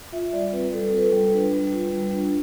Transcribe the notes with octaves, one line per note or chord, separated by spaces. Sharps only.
F4 E5
G3 D5
C4 B4
G3 A4
F4 B4
A4
G3
D4 B4
G3
F4
G3
D4